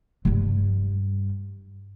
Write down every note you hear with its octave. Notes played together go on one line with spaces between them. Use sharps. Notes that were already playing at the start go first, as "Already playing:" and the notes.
G2 G3